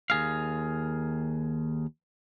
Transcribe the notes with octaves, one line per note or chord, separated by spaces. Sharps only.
D#2 G#4 F5